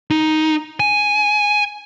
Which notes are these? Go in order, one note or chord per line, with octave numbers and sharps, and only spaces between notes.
D#4
G#5